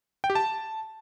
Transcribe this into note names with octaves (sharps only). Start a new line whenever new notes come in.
G5
G4
A5